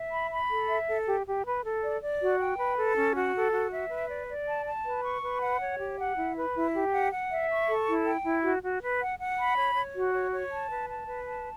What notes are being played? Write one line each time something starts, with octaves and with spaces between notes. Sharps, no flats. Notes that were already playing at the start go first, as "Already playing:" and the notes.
Already playing: E5
B5
B5
A4
E5
A4
G4
G4
B4
A4
D5
D5
F#4
G5
B4
A4
C#4
F#4
A4
F#4
E5
B4
D5
D5
A5
A5
B4
C#6
B4
F#5
C#5
G4
F#5
E4
B4
E4
G4
F#5
F#5
E5
C#6
A4
E4
G5
E4
F#4
F#4
B4
F#5
F#5
B5
C#5
C#5
F#4
C#5
C#5
A5
B4
A5
B4
A5